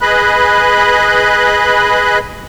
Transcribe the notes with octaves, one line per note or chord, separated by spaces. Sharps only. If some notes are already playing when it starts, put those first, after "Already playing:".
G#4 B4 D#5 B5 F#6